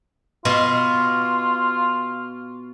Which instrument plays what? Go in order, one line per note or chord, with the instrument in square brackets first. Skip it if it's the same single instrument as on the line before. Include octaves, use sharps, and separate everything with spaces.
[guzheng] B2 C6 [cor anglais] F4